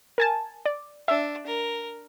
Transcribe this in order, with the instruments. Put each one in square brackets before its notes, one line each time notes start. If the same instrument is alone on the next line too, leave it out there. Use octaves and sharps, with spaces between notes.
[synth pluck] A#4 G#5 A5
D5
[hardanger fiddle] D4 [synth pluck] E5
[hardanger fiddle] A#4